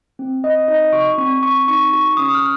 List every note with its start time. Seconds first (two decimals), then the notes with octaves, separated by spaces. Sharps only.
0.19 C4
0.44 C4 D#5
0.68 D#4 D#5
0.93 F#4 C#6
1.18 C4 C#6
1.43 C4 C#6
1.68 D#4 C#6
1.93 F#4 C#6
2.13 C#6
2.17 C#4 D#6
2.35 F6